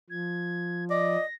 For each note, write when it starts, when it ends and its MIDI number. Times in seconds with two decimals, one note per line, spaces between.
0.10 1.17 53
0.10 0.85 92
0.90 1.22 74
0.90 1.26 75
0.90 1.34 94